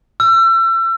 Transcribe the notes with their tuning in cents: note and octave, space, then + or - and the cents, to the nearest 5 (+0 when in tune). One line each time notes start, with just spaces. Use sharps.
E6 +35